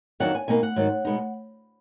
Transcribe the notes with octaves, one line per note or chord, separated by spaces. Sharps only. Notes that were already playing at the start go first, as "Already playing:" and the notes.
F2 D#3 F#3 D4 F#5
G#5
B2 A#3 D#4 G#5
F#5
G#2 D#3 F#3
B2 G#3 B3 D#4